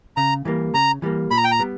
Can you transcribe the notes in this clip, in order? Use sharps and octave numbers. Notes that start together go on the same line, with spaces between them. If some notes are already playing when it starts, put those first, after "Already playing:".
C#3 A#5
E3 G3 A#3
C#3 A#5
E3 G3 A#3
A#2 B5
A#5
G5
A#5
G3 B3